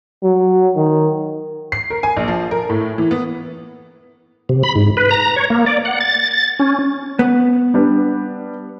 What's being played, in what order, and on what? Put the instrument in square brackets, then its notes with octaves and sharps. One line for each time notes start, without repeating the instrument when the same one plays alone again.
[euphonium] F#3
D#3
[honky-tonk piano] C7
A#4
G#5
A#1
F3
A#4
A2
E3
B3
[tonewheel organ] C3
B5
G#2
B4
A#5
C#5
A#3
D5
F#5
A6
A6
C#4
[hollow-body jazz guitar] B3
[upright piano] G3 D4 B4